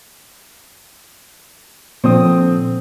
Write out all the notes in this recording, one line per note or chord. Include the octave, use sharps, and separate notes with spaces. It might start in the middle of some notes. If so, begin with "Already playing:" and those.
A#2 D3 F3 C4 D#6